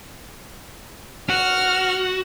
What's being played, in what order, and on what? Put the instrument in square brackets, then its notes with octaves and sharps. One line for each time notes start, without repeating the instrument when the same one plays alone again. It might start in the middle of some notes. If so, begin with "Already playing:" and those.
[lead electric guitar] F#4 [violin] F6